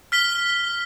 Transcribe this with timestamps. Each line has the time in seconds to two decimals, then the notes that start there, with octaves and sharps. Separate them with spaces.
0.12 F6 B6 G7